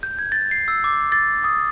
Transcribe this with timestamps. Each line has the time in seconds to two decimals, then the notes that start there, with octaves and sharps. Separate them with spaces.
0.03 G6
0.19 G#6
0.32 A6
0.51 C7
0.68 E6
0.84 D6
1.12 A6
1.44 D#6